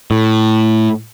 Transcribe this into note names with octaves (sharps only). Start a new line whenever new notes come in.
A2